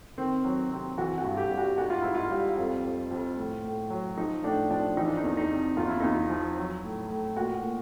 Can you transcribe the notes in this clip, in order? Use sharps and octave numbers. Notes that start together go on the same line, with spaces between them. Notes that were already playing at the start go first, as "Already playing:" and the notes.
D#3 C4
F#3
C3 C4
E3 F#4
F#4
G2
G4
G3
F#4
G#2 F#4
F4
G#2 E4
F4
G3
F2
F2
F2
A2
A2
F#3
F3 D#4
A2 D4
F3 D4
E3 D#4
D4
D#4
E2
D#4
C3
E2 F4
E4
E2 D#4
E4
F3
F#3
A2
A2
A#2 F#4
A#2